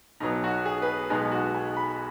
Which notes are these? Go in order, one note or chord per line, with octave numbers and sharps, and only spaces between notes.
B1 B2 F#3 B3 D#4
F#4
G#4
B4
G#4
B1 B2 G#3 B3 D#4
F#4
G#5
B5